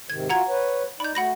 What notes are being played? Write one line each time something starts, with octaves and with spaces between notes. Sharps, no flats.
G#2 C3 D#3 G#6
F4 F#4 F#5 A#5 G#6
B4 C#5
D#4 D5 B5 G6
A3 F#4 F#5 B5 A#6